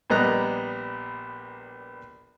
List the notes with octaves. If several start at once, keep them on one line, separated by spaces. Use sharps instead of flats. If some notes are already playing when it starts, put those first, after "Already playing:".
A#1 G3 B3 D#5 A#5 F#6